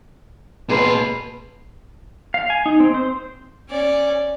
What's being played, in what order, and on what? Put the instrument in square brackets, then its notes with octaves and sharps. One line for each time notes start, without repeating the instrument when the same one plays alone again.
[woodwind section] C#2 C6 [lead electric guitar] A#2 B4
[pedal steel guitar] F5
G#5
D#4
C4
C5
[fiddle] C#4 D5